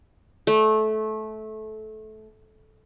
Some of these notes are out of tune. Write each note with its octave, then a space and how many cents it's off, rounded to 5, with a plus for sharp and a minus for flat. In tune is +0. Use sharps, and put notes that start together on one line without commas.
A3 -20